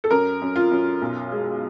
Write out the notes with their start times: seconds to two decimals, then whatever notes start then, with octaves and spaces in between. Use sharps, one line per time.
0.04 A4
0.10 F#2 A#4
0.41 F#2
0.56 F4
0.71 F#2
1.02 B1
1.32 G#3